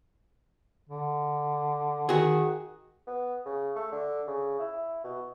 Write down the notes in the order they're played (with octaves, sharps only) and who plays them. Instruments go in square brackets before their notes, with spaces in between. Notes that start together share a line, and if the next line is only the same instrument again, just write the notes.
[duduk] D3
[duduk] D#3 [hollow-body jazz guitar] F#4 G#4
[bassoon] B3
C#3
A3
D3
C#3
E4
B2